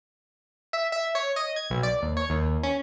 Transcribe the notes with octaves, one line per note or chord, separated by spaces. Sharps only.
E5
E5
C#5
D#5
G#6
B1
D5
D#2
C#5
D#2
C#4